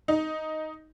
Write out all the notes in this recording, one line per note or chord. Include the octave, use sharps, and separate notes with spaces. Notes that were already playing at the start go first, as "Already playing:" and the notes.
D#4